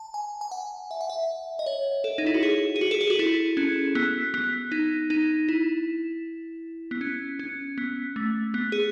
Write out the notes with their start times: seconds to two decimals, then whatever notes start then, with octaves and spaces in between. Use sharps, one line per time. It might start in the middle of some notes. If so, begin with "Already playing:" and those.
Already playing: A5
0.14 G#5
0.41 G#5
0.51 F#5
0.91 E5
1.01 F#5
1.10 E5
1.59 D#5
1.66 C#5
2.04 A4
2.18 D#4
2.26 E4
2.34 F#4
2.43 G#4
2.76 G#4
2.81 F#4
2.91 A4
3.01 G#4
3.10 F#4
3.19 E4
3.57 C#4
3.95 B3
4.34 B3
4.72 D#4
5.10 D#4
5.48 E4
6.91 B3
7.01 C#4
7.39 C#4
7.78 B3
8.16 A3
8.54 B3
8.72 G#4